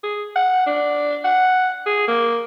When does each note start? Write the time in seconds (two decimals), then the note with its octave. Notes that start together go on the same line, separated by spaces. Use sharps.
0.03 G#4
0.36 F#5
0.66 D4
1.24 F#5
1.86 G#4
2.08 A#3